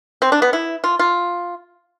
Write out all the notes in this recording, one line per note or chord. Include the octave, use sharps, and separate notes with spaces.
C4
D4
B3
E4
F4
F4